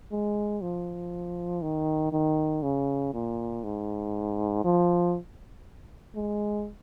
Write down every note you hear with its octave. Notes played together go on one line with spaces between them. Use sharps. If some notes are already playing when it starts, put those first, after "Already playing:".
G#3
F3
D#3
D#3
C#3
A#2
G#2
F3
G#3